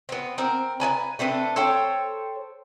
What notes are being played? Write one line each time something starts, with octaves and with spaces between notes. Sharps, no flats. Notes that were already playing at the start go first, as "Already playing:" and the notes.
B3 C4
C4 A#4
B4 D5 G#5 A#5
A3 C4 D4 B4
A4 C5 C#5 G5